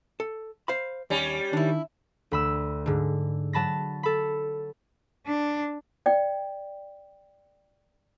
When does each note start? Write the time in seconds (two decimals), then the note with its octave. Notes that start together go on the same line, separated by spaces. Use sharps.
0.20 A4
0.68 C5 F5 B5
1.10 D#2 G3 C#4
1.53 D#3 D4 E4
2.31 D2 B5 E6
2.86 G#2 D3
3.53 F#3 A5 B5 A#6
4.03 A4 B5
5.27 D4
6.06 D5 G5